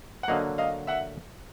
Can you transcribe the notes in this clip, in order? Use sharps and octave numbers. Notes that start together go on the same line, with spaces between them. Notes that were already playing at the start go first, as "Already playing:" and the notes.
F#5
D3 F#3 A#3 D#5 F5
D#5 F5
E5 F#5